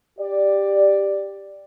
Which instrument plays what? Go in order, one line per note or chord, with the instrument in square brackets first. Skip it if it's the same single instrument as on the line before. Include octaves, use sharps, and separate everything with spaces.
[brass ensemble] G4 D5